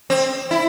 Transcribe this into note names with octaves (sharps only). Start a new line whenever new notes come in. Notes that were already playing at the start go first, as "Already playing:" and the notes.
C4
E4